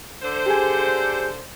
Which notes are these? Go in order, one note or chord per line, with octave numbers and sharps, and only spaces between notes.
D3 C5
G4 G#4 G#5